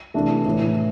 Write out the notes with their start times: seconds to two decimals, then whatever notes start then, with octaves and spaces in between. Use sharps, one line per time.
0.14 C3 E3 A3 D4
0.45 A2 E3 A3